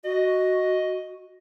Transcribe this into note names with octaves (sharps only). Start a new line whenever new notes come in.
F#4 D#5